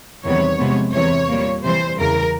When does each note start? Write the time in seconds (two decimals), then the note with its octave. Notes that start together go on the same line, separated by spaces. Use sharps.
0.24 E2 C3 D#3 G3 B3 C#5
0.58 C3 F3 G#3 B3
0.94 E2 C3 E3 C#5
1.29 A#2 G3 A#3
1.64 C3 E3 G3 C5
1.98 E2 C#3 E3 A#4